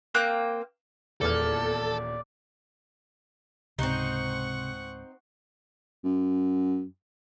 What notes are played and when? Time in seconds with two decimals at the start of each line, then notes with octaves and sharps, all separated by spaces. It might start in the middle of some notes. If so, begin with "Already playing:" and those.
0.15 A#3 C4 G5 F#6
1.21 D#1 E2 A#2 A4 D5 F6 G#6
3.79 C#2 G#2 C3 C4 D#4 F#5 C#6
6.04 F#2